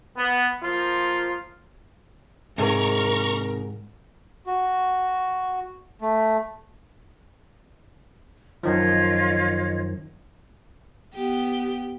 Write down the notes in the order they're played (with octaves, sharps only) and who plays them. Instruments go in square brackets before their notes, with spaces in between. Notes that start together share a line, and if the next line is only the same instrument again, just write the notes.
[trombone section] B3
F3 A#3 F4
[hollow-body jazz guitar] G#2 [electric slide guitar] C3 D#3 G#4 [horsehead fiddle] A#4 [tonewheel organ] A#5 C#6
[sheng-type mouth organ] F#4
A3
[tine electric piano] F#2 D#3 F3 [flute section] F4 C#5 D#5
[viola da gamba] B3 G4